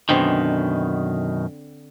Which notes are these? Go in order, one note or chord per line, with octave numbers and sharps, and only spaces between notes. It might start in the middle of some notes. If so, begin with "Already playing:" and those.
F#2 B2 D3 D#3 C4